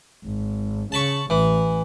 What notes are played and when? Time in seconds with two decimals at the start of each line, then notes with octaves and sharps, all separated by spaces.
0.24 G#1
0.92 C#3 A5 B5 C#6
1.30 A1 E3